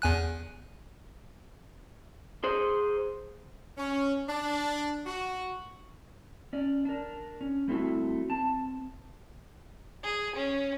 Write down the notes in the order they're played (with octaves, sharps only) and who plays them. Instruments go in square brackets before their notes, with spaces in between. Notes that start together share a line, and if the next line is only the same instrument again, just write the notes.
[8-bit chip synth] E2 G#5 F#6
[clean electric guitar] G#4 C5
[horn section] C#4
D4
F#4
[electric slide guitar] C#4 D5
D4 A#4
C#4
G3 A3 C4 E4 F#4
C4 A5
[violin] G#4
C#4